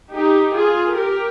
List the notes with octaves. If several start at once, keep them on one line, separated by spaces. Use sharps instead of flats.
D#4 G4
F4 G#4
G4 A#4